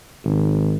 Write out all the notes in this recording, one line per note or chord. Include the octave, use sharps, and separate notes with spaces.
G#1